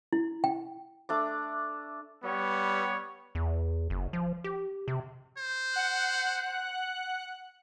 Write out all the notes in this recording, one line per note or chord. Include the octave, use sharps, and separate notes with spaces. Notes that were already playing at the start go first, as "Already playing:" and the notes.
E4
G5
A3 D4 D6
G3 B3 C#5
E2
F#1
F3
G4
C3
C5
F#5 F#6